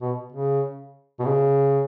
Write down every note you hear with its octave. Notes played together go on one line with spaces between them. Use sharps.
B2
C#3
B2
C#3